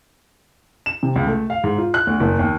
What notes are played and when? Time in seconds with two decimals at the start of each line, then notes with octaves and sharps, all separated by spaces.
0.86 E7
1.03 C3
1.16 C#2
1.27 A3
1.50 F5
1.64 G#2
1.78 F4
1.94 F#6
2.07 D2
2.20 F#1
2.39 D#2